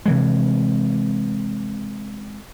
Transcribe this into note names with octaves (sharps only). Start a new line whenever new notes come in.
C3 E3 G#3